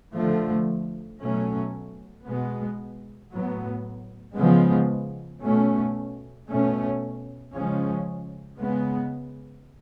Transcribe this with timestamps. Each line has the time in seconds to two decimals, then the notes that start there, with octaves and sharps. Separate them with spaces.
0.16 D3 F3 A3
1.21 B2 F#3 A3 C#4
2.27 B2 G#3 B3
3.31 A2 F#3 B3
4.37 C#3 F3 G#3 B3
5.43 B2 A3 C#4
6.49 B2 A3 C#4
7.53 C#3 F3 G#3 C#4
8.59 C#3 G#3 B3